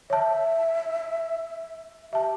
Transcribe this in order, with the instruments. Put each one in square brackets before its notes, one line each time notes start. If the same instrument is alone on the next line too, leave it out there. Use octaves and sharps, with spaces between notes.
[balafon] C#5 A5 [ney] E5
[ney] G4 [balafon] E5 A5